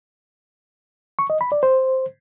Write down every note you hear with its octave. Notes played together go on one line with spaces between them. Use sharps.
C#6
D#5
B5
D5
C5